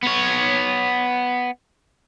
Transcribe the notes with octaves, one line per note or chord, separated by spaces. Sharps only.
B3 C#5